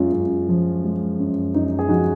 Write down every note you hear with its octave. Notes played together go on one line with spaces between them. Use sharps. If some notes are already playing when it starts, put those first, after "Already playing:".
Already playing: F#2 G#3 C#4 F4
F#2
F3
G#3
F#2
F#2 D#4
G#4
F3 D#4 F#4